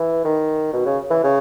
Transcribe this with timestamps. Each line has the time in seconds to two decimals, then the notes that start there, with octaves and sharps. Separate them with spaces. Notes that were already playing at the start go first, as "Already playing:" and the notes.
Already playing: E3
0.24 D#3
0.73 B2
0.86 C#3
1.10 E3
1.24 C#3